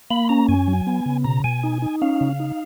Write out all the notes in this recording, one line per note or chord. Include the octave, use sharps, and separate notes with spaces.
A#3 B5
C#4 A#5
F#2 G#5
F#3
B3
C#3
B2 A#5
B2 G#5
D#4
D#4
C#4 F5
C#3
D#4